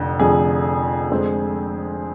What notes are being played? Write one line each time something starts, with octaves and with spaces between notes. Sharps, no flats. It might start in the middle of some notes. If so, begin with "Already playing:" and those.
Already playing: F1 F2 D3 F3
F1 F2 D3 F3 G#4
F2 D3 G#3 C4